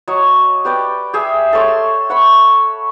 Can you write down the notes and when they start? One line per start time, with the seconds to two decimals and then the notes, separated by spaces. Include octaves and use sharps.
0.08 F#3 C#5 D#5
0.65 G4 B4 D5 G5
1.13 G4 G#4 E5
1.53 A4 C#5 C6
2.10 F#5 B5 C#6